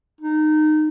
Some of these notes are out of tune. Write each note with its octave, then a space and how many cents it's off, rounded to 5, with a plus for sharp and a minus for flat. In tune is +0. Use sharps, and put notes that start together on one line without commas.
D#4 -20